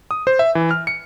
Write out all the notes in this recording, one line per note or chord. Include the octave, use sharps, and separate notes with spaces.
D#6
C5
E5
E3
F6
C#7